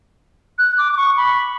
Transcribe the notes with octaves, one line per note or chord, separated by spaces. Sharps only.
F#6
D6
D6
C#6
B5